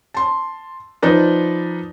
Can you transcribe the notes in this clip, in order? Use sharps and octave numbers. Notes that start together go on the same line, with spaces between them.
A5 C6
F3 D#4 B4 D5